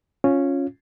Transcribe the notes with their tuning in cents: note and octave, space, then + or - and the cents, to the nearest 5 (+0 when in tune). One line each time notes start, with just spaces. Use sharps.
C#4 -5 F4 +10